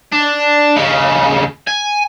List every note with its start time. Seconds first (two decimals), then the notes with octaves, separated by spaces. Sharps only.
0.12 D4
0.76 D#2 C#3
1.67 G#5